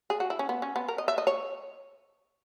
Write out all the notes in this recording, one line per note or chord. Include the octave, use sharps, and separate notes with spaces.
G#4
F#4
E4
C#4
B3
C#4
B3
A#4
D#5
E5
D#5
C#5